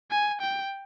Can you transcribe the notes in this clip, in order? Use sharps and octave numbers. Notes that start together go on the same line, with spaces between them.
G#5
G5